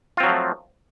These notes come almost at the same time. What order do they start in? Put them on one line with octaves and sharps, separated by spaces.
F4 C4 F#3 F3 A3